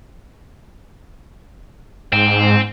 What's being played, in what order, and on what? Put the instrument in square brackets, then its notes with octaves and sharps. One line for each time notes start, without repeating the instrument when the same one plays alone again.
[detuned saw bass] G#2 [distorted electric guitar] C4